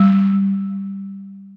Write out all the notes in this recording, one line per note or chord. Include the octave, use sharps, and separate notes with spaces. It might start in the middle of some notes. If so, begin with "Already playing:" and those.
Already playing: G3